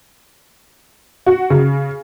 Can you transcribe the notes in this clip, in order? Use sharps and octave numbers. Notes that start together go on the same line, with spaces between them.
F#4
C#3